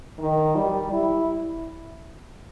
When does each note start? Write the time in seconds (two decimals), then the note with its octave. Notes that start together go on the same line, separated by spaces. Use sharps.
0.19 D#3
0.55 G3
0.92 E4